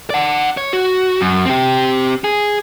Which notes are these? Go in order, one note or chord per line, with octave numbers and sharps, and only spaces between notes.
D5 F#5
C#5
F#4
F#2
C4 G4
G#4